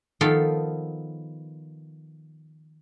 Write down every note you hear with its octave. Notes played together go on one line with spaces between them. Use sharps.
D#3 F3 B3 A4 F5